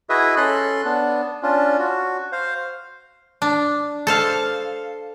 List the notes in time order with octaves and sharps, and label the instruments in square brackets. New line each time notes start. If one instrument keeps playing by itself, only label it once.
[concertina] E4 F#4 G#4 B4 D#5 E5
C#4 A4 C6 F#6
B3 D4
C#4 D4 F4
F#4
C5 F5
[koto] D4
A4 C5 F5